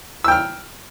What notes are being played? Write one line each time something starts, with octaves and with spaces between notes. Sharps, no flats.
G5 E6 F6